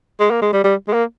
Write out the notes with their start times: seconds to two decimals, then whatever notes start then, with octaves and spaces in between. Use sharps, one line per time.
0.20 G#3
0.31 A#3
0.42 G#3
0.53 G3
0.64 G3
0.88 G#3
0.93 A#3